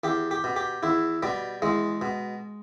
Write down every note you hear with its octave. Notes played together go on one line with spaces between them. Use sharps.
E2 G4
G4
B2
G4
E2 E4
B2 G3
E2 G#3
B2